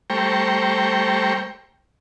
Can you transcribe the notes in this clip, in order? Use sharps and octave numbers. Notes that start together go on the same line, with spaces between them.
G3 A3 C5 G5 A#5 C#6